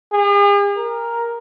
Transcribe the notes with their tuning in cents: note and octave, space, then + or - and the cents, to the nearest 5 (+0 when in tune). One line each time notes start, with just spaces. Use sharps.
G#4 -45
A#4 +5